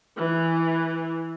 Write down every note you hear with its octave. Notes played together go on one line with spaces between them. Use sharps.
E3